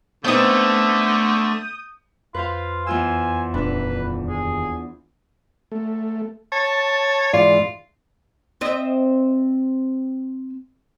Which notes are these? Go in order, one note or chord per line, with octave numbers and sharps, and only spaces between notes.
D3 A3 B3 C4 D#4 D#6 G6
F2 F4 B4 C5 F5
E2 F4 G#5 E6
D#1 D4 B4
G#4
A3
C#5 A5
G#2 E3 F4 D5
C4 D#5 E5